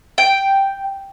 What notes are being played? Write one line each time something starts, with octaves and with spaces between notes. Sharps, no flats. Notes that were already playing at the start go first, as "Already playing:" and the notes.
G5